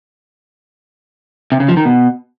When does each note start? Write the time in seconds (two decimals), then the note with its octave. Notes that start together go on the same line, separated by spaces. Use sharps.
1.52 C3
1.60 C#3
1.68 F3
1.77 D#3
1.85 B2